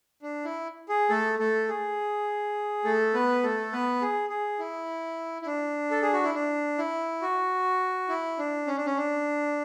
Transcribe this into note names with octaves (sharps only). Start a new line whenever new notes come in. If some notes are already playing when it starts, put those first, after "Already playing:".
D4
E4
G#4
A3 A4
A3 A4
G#4
A3 A4
B3 B4
A3 A4
B3 B4
G#4
G#4
E4
E4
D4
A4
G#4
F#4
E4
D4
E4
F#4
E4
D4
C#4
D4
C#4
D4